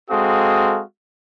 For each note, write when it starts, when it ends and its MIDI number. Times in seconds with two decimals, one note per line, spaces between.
0.10 0.82 56
0.10 0.82 60
0.10 0.82 66
0.10 0.82 69
0.10 0.82 77
0.10 0.82 87